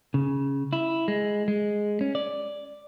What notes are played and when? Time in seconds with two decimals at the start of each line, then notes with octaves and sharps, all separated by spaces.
0.14 C#3
0.73 E4
1.08 G#3
1.48 G#3
2.01 C#4
2.15 D5